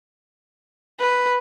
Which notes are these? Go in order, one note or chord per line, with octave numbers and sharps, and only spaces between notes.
B4